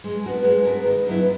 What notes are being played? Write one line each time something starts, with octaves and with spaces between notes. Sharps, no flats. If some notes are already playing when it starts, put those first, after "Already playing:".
G#3
B3 F#4 A#4
G#3
B3 F#4 A#4
D#3
F#3 B3 E4